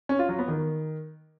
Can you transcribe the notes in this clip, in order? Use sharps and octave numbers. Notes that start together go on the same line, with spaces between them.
C#4
F4
F#3
B3
D#3